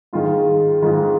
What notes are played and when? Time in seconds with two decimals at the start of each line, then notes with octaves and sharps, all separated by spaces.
0.13 G#2 D#3 G#3 F4
0.82 G#2 D#3 G#3 F4